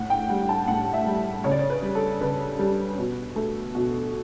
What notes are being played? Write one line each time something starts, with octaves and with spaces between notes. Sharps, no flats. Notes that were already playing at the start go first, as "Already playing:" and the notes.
Already playing: A2 F#5
G5
G3 F#5
A5
A2 F#5
E5
G3
C#3 C#5
D5
C#5
B4
G3
A4
C#3 B4
G3
B2
A3
B2